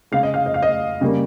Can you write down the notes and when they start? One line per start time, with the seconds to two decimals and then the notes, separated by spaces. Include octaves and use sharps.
0.12 C#3 G#3 F5
0.23 D#5
0.34 F5
0.46 D#5
0.54 F5
0.63 D#5
1.01 C#3 G3 A#3